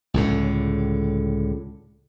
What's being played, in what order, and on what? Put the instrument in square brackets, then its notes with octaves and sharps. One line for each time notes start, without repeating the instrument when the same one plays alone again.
[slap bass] C#2 A2 D3